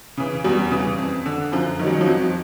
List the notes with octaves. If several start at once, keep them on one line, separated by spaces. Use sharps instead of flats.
C#3 E3
E2 G3
C#3 E3
F2
D3
F#2 F3
D#3 F#3
G3
F#3
F3
F2 F#3